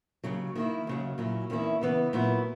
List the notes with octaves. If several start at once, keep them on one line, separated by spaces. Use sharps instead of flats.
D#2 C#3 F#3
D#3 A#3 E4
D#2 C#3 F#3
A#2 F#3 C#4 E4
E2 D#3 A#3 C#4 E4
C#3 E3 B3
A#2 F#3 B3 E4